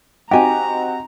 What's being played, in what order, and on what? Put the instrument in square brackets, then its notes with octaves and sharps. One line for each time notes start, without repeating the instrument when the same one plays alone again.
[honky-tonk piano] C4 D#4 F#4 [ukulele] G4 G#5 [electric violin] A#5